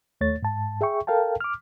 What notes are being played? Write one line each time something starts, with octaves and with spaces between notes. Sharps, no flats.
D#2 A3 C#5 A6
G#2 A5
G#4 E5 G5 C#6
A4 A#4 F5 G5 A5
D6 F6